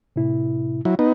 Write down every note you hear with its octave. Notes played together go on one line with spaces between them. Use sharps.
A2 C3 E4
F#3 E4
B3 D#4